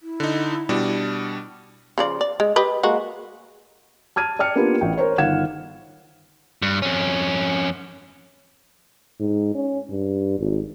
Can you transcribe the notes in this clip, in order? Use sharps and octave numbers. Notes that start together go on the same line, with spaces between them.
E4
D3 D#4
B2 G3 D4
C#3 F3 D5
D5
G#3
G4 B4 D#5
G#3 A#3 F#4
A5 F6 G#6 D#7
D5 G5 F6 C#7
A#3 B3 D4 F4 G4 B4
A1 G5
A#4 C5 C#5
G1 D#3 F5 F#5 G#6 E7
G2
F2 C#4
G#2
C#4
G2
G#1